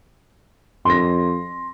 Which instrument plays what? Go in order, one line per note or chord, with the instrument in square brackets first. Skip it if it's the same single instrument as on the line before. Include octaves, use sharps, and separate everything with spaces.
[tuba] F2 [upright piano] C6 A#6